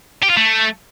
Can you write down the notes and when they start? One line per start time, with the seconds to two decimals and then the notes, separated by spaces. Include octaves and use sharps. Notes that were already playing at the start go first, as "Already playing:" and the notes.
0.23 G4
0.30 F4
0.37 A3